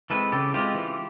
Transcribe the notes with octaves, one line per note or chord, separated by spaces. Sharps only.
E3 G#3 C4 A4 B4
C#3 G4 A4
E3 G#3 C4 F4 G4
E3